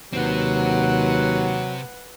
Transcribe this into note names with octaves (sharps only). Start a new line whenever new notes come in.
D#2 C3 F#3 C4 B4 F#5